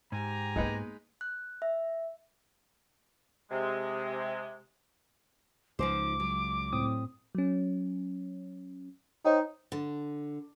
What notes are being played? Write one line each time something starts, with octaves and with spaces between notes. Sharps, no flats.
G#2 G4 G#5 A#5
G#3 A#3 B3 D#4 B4
F#6
E5
C3 G#3
C#2 F3 D#4 C5 D6
F#3
A2 C4 D#6
F#3 C#4
D#4 C5 C#5 G5
D3